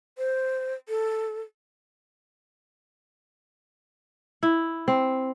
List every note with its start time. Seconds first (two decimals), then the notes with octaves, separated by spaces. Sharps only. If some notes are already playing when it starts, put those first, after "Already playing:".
0.18 C5
0.89 A4
4.43 E4
4.88 C4